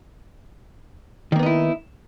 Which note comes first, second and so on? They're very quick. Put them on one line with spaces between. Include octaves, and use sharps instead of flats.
D#3 A#3 B3 D#4 E4